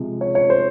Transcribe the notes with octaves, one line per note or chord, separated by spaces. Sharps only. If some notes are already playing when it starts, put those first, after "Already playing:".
Already playing: C3 F3 G#3
C#5
C#5
C5